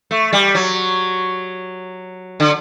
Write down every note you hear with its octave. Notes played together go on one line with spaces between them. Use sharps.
A3
G3
F#3
D3